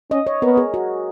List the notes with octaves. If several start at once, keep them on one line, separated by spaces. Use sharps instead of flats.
C#4 D#5
C#5
B3 A#4
G#4
F#4